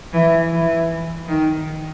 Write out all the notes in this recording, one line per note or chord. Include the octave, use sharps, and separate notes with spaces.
E3
E3
D#3